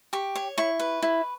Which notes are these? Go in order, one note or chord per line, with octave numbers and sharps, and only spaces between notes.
G4 C#6
C#5
E4 C#6
B4
E4